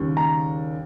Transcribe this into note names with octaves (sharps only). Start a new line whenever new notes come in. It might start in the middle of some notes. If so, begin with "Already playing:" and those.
Already playing: D#2 C#3 G3
A#5